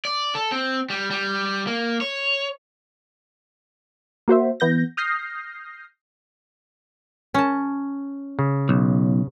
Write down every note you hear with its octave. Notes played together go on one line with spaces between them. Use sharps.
D5
A4
C4
G3
G3
A#3
C#5
A#3 F#4 C5 E5
E3 B3 G6 A#6
D#6 F6 G6 A#6 C7
C#4 A5
C#3
B1